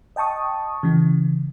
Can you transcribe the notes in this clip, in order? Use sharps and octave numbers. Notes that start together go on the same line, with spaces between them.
D#5 G5 A5 C#6 D#6
C#3 E3